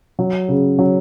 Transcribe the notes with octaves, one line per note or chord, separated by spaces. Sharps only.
F#3
C#3
F#3